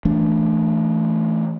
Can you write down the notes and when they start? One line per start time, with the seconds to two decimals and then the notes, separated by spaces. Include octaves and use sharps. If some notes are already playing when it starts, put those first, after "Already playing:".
0.05 E3 A3 D4